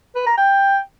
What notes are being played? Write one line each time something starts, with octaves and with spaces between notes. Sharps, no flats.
B4
A#5
G5